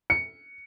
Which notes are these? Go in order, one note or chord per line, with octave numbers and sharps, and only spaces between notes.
C#7